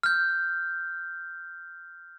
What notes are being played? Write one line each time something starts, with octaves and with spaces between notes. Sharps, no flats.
F6 G6